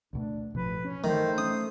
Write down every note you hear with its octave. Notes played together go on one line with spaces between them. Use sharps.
D2 B2 A3 D4
A1 B2 F3 B4
C#4
G2 D#3 E3 F#3 A3 C5
C#4 D#6